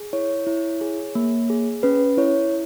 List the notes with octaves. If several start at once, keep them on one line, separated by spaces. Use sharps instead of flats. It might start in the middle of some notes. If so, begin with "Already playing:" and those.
Already playing: G#4
E4 C#5
E4
G#4
A#3
G#4
C#4 B4
E4 C#5